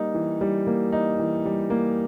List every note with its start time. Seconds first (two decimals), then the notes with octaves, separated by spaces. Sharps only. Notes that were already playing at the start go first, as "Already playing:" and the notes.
Already playing: G3 A#3 D#4
0.14 E3
0.41 G3
0.67 A#3
0.92 D#4
1.19 E3
1.45 G3
1.70 A#3